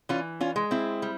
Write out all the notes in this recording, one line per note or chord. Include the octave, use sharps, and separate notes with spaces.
E3 C#4 F4
C#4 F4
G#3
C4 E4
G3